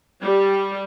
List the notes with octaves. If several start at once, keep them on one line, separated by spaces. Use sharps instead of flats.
G3